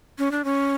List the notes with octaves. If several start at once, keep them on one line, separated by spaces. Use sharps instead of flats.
C#4
D4
C#4